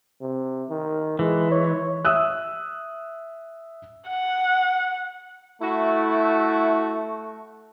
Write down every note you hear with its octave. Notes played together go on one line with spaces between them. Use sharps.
C3
D#3
E3 G#3
C#5
E5 D#6 E6 F#6
F#5
A3 E4 F#4